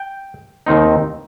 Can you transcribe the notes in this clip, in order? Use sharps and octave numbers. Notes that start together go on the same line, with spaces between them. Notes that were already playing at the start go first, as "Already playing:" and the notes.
Already playing: G5
D#2 D#3 C4 D#4